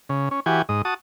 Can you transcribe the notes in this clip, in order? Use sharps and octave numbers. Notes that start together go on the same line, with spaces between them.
C#3
C#4
E3 F#4 G4 G#5
G#2 D#5
F#4 A5 D#6